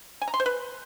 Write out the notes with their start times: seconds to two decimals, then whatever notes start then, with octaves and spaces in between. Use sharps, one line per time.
0.22 G#5
0.28 A#5
0.34 C6
0.40 C5
0.46 B4